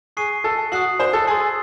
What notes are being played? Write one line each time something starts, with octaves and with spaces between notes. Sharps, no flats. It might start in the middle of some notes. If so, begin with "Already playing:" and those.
G#4 C#6 F#6 C7 D#7
A4
F#4 D#6 F#6 C7 F#7
C5
A4
G#4 C6 E6 A6 C7